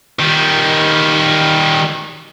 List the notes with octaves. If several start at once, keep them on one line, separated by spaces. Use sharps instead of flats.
D#3 G3